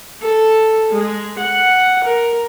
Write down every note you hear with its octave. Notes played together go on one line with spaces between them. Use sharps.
A4
G#3
F#5
A#4